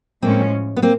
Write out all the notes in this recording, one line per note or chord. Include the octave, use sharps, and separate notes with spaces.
A2 F3 G#3 A#3 C4 C#4
B3
A#3 C4